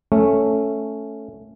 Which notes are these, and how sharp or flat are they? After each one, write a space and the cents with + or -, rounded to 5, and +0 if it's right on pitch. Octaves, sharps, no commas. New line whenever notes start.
A3 +0 C#4 +0